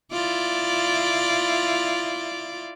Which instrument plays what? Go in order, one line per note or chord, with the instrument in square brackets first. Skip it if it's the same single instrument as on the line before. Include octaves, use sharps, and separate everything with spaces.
[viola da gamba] E4 F4 D5